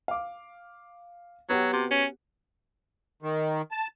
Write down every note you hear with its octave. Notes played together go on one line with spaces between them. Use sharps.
F5 D6
F#3 B3 F#4 G4
C3
C#4
D#3
A5